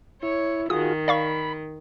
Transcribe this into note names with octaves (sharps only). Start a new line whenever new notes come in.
E4 C#5
D#3 F4 F#4 G#4 D#6
D5 F5 B5 C#6